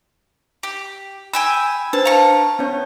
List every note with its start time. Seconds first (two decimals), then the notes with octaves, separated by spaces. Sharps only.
0.63 G4
1.33 G5 G#5 B5 E6
1.93 D4 B4 C5 A5
2.05 F5 A5 A#5 C#6
2.59 B3 C#4 C#5